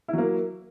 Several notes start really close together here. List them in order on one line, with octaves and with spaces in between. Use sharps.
E4 F#3 A#3